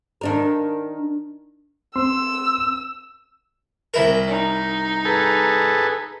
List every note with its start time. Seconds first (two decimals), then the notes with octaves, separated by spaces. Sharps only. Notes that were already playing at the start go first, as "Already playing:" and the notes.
0.21 D#3 D4 A#4
1.96 C4 C6 E6
3.94 C2 E4 A#4
4.27 D#4
5.05 G#4 A4 B4